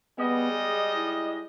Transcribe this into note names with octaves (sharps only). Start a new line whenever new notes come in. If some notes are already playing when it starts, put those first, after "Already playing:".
G3 G#3 B3 D#5
G#4
E4